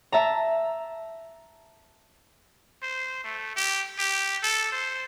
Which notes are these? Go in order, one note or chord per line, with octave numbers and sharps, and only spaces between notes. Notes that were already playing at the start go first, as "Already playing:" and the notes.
E5 A5 A#5
C5
A3
G4
G4
A4
C5